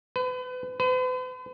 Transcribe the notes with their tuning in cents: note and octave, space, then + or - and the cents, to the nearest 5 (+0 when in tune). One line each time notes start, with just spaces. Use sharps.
B4 +35
B4 +45